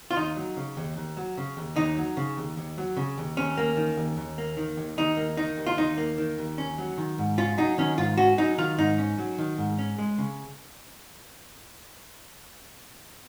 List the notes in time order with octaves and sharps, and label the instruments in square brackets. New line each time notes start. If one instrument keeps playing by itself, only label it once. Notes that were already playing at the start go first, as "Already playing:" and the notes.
[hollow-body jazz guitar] F4
D#2 D#4
F#3
C#3
D#2
D#2
F#3
C#3
D#2
D#2 D#4
F#3
C#3
D#2
D#2
F#3
C#3
D#2
D#2 C#4
A#3
D#3
D#2
D#2
A#3
D#3
D#2
D#2 D#4
A#3
D#3 D#4
D#2
F4
D#2 D#4
A#3
D#3
D#2
C#4
F#3
D#3
G#2
C#4 F4
F#3 D#4
D#3 C#4
G#2 F4
C#4 F#4
F#3 D#4
D#3 F4
G#2 D#4
C#4
F#3
D#3
G#2
C#4
G#3
C#3